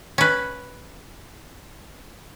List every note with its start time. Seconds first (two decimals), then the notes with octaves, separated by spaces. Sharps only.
0.18 C#4 B4